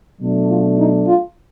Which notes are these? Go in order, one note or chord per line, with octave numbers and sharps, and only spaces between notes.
B2 F#3 A3 D4
F4
D#4
F4